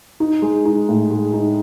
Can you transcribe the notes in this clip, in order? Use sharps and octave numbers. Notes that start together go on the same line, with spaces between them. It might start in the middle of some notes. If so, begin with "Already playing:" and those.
D#4
G#3
D#4
A2
G#3
D#4